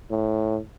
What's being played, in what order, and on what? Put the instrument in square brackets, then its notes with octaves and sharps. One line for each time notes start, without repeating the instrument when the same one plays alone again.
[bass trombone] A2